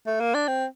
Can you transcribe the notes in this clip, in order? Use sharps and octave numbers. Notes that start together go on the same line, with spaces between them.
A3
A#3
D4
C4